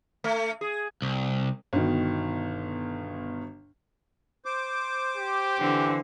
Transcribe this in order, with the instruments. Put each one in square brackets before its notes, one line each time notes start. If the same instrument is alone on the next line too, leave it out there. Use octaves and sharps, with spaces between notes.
[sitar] A3
G#4
[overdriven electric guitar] C2
[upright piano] G1 B2 D#3
[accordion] C5 D6
[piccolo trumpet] G4
[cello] D3 C4 [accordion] E3